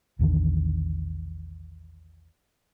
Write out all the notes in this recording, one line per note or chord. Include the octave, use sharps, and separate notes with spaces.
A#1 E2 D3 D#3